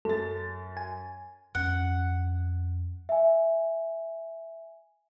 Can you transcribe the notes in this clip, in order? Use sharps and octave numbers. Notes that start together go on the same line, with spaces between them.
F#2 A4 A6
G#5
F2 C#4 F#5
E5 G#5